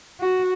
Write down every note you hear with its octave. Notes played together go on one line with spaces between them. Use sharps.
F#4